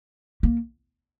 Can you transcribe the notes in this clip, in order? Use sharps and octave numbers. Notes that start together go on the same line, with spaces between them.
A#3